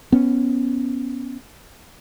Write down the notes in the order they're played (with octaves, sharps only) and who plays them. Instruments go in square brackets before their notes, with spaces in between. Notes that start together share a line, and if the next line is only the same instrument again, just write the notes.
[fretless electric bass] B3 C#4